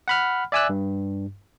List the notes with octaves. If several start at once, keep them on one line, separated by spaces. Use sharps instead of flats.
F#5 B5 F6
D5 E5 G#5 D6 E6 F#6
G2